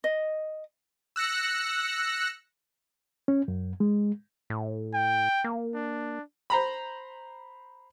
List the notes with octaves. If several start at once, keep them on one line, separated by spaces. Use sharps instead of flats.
D#5
E6 F#6 A#6 C#7
C#4
F#2
G#3
A2
G5
A#3
D4
C5 A#5 B5